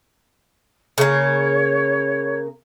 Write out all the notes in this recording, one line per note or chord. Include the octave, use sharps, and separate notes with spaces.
C#3 A#3 C#5